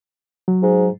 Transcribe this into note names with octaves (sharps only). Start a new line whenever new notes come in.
F#3
G#2